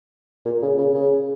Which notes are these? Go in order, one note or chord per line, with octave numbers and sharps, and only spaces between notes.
A#2
C#3
C#3
C#3